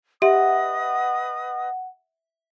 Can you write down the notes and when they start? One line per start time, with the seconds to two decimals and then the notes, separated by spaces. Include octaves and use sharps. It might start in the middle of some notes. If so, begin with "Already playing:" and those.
0.22 G4 B4 D#5 E5 F#5 D#6